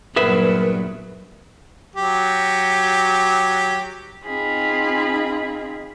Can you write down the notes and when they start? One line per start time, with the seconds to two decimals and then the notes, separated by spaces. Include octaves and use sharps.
0.16 G2 A#2 F#3 B3 G#4 A#4 B4 E5
1.96 F#3 G4
4.24 C4 D#4 F4 G#4 B5